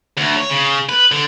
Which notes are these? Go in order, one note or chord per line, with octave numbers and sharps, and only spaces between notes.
D2
C#5
C#3
B4
D3